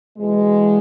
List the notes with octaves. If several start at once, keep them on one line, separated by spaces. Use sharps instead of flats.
E2 B2 G#3